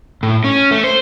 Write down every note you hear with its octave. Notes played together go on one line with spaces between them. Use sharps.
A2
C#4
A3
C5